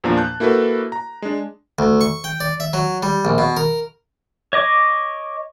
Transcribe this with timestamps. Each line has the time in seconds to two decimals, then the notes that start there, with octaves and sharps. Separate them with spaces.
0.04 E2 A#2 F3 A#3 D4 A#5
0.17 A5 F#6 G6
0.40 A#3 E4 F#4 A4 B4
0.92 A#5
1.22 G#3 D4
1.79 D2
2.01 C#6
2.24 G5
2.40 D5
2.60 E5
2.73 F#3
3.03 G3
3.25 A#1
3.38 B2
3.57 A#4
4.53 C#5 D#5 D6